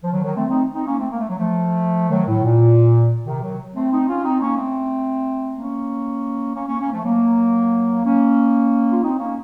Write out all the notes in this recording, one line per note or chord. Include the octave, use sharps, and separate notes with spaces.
F3
D#3 F#3
D#3 F#3
A3 C4
C4 D#4
C4 D#4
A#3 C#4
A3 C4
A#3
A3
F#3
F3 A3
D#3 F#3
A2
A#2
C3 D#3
D#3 F#3
A3 C4
C4 D#4
C#4 F4
C4 D#4
A#3 C#4
A3 C4
A#3 C#4
A#3 C#4
A#3 C#4
A#3 C#4
F3 A3
F#3 A#3
A#3 C#4
F4
C4 D#4
A#3 C#4